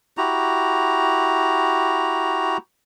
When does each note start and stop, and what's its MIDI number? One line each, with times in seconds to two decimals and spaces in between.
0.17 2.57 64
0.17 2.57 66
0.17 2.57 67
0.17 2.57 82